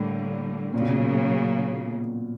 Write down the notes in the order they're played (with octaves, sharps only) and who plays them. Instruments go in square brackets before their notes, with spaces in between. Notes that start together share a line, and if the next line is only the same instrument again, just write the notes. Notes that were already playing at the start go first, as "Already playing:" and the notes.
Already playing: [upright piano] A2 [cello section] D3 G3 A#3
[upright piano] A#2 [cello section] C#3 F#3 A#3
[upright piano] B2
A#2